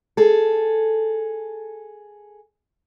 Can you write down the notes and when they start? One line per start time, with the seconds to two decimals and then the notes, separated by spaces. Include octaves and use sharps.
0.17 G#4 A4